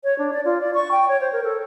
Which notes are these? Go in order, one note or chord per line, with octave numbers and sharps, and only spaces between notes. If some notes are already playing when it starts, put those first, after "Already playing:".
C#5
D4
D5
F4
D5
C#6
G5
C#5
C5
A#4
A4